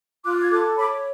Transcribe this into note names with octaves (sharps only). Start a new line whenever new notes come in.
F4 D6 F#6
G#6
A4 D6 F#6
C#5 B5 D6